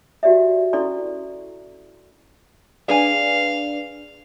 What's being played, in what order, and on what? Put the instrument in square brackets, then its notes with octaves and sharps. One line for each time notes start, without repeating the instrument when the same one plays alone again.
[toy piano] F#4 G4 D5 E5
C#4 E4 A4 D5 C6 C#6
[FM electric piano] D4 B4 D5 [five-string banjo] G#4 G#5 [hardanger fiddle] F5